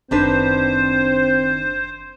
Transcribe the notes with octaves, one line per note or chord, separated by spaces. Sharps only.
F#1 D#3 C4 D4 B4 C5